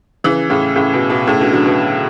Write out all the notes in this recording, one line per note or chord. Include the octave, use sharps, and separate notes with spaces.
C#3 E3
A2 C#3
A2 C#3
B2
B2
A2 C#3
B2 D3
D3 F#3
B2